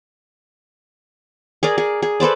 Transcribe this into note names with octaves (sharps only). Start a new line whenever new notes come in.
G#4 A#4 D5
G#4
G#4
A4 B4 C5 D5